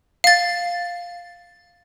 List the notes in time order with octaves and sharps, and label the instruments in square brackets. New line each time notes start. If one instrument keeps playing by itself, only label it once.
[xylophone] F5 A6